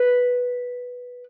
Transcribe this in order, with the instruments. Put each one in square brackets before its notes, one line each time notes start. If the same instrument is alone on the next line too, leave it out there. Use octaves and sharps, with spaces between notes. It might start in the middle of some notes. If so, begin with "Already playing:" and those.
Already playing: [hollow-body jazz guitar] B4